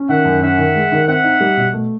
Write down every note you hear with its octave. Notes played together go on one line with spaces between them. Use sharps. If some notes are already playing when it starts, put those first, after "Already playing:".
Already playing: C#4
D#3 E5 F#5
F#2
C#4 E5 F#5
D#3
G#3
D#3
C4 E5 F#5
D#4
G3
B2
A3